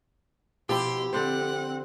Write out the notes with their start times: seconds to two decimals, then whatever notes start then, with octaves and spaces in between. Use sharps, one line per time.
0.69 B2 F3 E4 G4 C6
1.13 D3 C4 C5 F#5